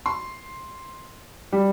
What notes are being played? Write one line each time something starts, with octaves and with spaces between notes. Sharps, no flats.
C6
G3